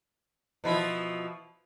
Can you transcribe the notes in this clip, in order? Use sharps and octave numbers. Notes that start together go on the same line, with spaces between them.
B2 F3 E4